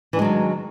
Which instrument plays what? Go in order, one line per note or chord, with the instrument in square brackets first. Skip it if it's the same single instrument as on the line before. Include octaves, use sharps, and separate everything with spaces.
[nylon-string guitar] E3
D4
G#3
F#3
D#3